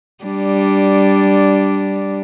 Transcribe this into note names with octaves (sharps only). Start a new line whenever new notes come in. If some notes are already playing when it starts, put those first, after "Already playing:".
G3 D4